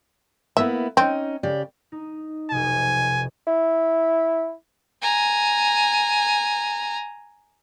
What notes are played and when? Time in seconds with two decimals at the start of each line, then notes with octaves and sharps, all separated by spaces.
0.57 A#3 B3 E4 E5
0.97 C4 C#4 D#4
1.43 C#3 G4 D5
1.92 D#4
2.51 F1 B1 C3 G#5
3.47 E4
5.01 G#5 A#5